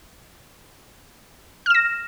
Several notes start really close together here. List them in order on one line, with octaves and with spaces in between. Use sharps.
F6 E7 A#6